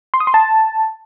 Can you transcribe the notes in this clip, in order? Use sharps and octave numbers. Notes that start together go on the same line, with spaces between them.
C6
D#6
C6
A5